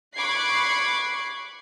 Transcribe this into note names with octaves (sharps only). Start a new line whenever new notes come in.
B5 C#6 D6 F#6 G#6 C7